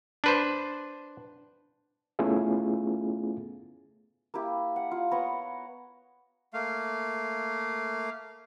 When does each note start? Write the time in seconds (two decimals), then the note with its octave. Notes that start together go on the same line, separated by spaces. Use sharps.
0.24 D4 B4 C5
2.19 A3 B3 C#4 E4 F4 G#4
4.34 A#3 E4 G4
4.76 F#5
4.91 F4
5.11 B3 C#5 F#5 A#5
6.54 A3 A#3 F5